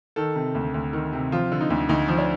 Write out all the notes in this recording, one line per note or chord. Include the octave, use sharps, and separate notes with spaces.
D#3 A4
C3
D2
D2
D#3
C3
F3 F4
D3
D#4
D2
D2 D#4
F3
D4